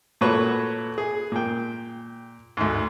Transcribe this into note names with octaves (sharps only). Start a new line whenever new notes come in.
A#2 A3 F#4 B4 C#5
G#4
A#2 G5
D2 G#2